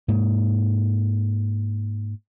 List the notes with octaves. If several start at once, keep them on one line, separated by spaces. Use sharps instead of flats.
G#2 A#3